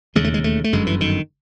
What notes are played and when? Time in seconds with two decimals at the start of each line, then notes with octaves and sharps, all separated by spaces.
0.15 E1 D#2 C#3 G#3
0.24 A3
0.34 G#3
0.44 A3
0.64 A3
0.73 G1 F#2 D3 G#3
0.86 E3
1.01 D#3